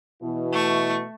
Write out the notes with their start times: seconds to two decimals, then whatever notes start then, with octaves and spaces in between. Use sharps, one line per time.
0.23 B2 E3 E4
0.52 A3 C#6